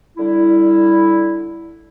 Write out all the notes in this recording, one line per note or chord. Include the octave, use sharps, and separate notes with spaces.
D3 G3 E4